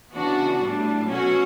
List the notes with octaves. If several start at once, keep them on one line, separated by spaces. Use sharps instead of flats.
C#3 E3 B3 D4 F#4
A2 G3 D4
B2 F#3 A3 C#4 F#4